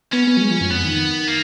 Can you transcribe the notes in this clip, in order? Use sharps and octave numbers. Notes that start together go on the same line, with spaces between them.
B3 C#4
B3
F#3
G#3
F3
F#2
F2 B3
D#3
A#3